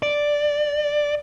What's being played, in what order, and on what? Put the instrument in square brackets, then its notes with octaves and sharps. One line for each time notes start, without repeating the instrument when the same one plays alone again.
[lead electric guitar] D5